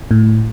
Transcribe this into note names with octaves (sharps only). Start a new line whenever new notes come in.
A2